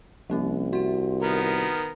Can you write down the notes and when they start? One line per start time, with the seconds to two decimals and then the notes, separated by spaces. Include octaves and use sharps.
0.30 C2 F3 A#3 C#4
0.73 F#4 E5 C6
1.22 D#3 B3 A#4